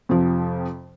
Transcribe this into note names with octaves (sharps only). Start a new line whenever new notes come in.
F2 C3 F3